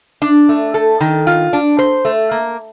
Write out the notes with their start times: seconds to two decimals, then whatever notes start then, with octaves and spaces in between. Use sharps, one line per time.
0.22 D4
0.49 A3
0.74 A4
1.00 D#3
1.27 F4
1.53 D4
1.79 C5
2.05 A3
2.31 A#3